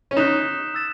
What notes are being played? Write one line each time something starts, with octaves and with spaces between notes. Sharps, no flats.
C#4
D#4 D#6 F#6 B6 E7
E6 A6 E7